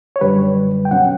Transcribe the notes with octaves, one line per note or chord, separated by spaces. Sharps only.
C#5
F#2 D3 G3 B4
G5
B2 F#3 C#4 F#5